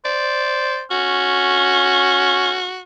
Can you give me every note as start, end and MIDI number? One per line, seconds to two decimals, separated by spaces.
0.05 0.84 72
0.05 0.80 74
0.91 2.65 61
0.91 2.81 66